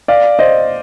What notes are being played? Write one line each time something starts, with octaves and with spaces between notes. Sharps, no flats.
D5 F5
C5 D#5